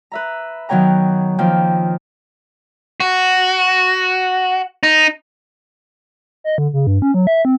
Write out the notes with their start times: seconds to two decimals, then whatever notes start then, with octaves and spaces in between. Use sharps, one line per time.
0.12 B4 E5 A#5
0.69 D#3 F#3 B3 C#5 G5 A#5
1.38 D#3 F3 A#3 C4 G5
3.00 F#4
4.83 D#4
6.44 D#5
6.58 D3
6.73 C#3
6.87 G2
7.02 C#4
7.14 F#3
7.27 E5
7.45 C4